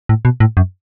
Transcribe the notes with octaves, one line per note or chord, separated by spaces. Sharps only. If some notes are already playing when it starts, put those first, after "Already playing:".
A2
B2
A2
F#2